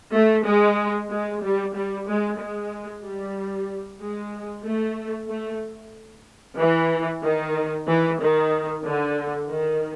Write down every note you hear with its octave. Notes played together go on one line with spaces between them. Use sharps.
A3
G#3
G#3
G3
G3
G#3
G#3
G3
G#3
A3
A3
E3
D#3
E3
D#3
D3
D#3